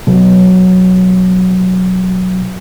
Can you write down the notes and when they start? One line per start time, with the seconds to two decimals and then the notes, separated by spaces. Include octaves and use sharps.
0.07 B2 F#3